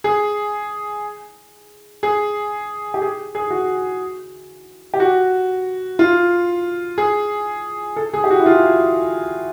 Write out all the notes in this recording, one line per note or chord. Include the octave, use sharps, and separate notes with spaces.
G#4
G#4
G4
G#4
G#4
F#4
G4
F#4
F4
G#4
A4
G#4
G4
F#4
E4
F4